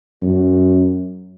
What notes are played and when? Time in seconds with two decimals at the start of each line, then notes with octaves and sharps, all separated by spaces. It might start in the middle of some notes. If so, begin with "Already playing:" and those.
0.23 F#2